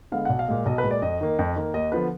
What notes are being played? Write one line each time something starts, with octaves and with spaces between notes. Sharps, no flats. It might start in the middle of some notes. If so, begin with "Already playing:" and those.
D3 G#3 B3 F5
B1 F#5
F5
A#2 G#3
B1 D#5
B4
A#2 G#3
D5
F2 D#5
D#3 A#3
F2
D#3 A#3
D#2 D#5
D3 F3 B3 B4